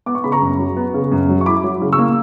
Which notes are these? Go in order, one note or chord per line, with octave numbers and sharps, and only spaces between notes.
B3 D6
C#6
C#3 B5
A#5 C#6
F#2
F#3
B3
C#3
F#2
F#3
C#6
E4 B5 D6
F#3
C#3
C#6 E6
A#3